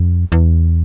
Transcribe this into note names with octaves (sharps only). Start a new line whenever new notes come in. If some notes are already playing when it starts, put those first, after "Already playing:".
Already playing: F2
E2